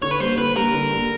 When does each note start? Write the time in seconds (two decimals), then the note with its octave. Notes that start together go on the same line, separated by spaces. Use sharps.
0.02 D3 C#5
0.11 B4
0.20 G3 A#3 C5
0.38 D3 B4
0.56 G3 A#3 A#4
0.74 D3
0.91 G3 A#3